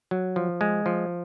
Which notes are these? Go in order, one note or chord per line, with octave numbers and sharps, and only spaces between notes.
F#3
F3
G#3
F3